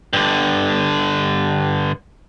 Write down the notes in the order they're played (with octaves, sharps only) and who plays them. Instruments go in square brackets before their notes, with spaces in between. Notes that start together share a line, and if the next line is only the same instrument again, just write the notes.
[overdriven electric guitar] G2 D3